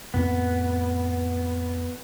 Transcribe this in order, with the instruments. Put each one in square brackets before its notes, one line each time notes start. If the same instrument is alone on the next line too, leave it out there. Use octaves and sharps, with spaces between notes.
[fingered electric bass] F2 A2 A#3 [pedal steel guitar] B3